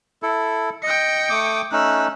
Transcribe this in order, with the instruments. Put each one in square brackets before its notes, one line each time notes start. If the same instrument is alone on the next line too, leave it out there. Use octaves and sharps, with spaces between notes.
[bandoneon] E4 A4
[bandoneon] D#5 [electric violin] G5 C#7
[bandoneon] A3 D6 D#6
[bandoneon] A3 C#4 D#4 [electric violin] E6 F#6